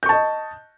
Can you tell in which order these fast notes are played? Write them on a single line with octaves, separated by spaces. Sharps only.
G6 C#6 A5 D#5